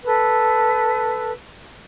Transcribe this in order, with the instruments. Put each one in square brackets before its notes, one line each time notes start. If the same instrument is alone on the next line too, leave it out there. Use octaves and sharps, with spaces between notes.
[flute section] A4 B4